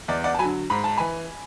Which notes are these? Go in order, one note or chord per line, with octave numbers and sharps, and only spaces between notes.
E2 D5
D5 F#5
A5
F#3 G#5 B5
D3
G#2 B5
A5
E3 G#5 B5